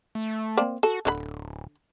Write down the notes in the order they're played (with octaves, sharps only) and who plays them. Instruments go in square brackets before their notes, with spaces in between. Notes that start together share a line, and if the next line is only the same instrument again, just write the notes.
[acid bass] A3
[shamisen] A#3 C4 D5
[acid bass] F#4 [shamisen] A4
[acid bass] D1 [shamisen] D3 F4 B5